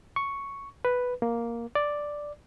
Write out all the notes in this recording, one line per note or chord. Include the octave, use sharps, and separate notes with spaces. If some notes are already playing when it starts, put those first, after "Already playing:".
C#6
B4
A#3
D5